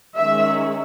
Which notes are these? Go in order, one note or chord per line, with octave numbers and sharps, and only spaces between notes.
D#3 G#3 C#4 E5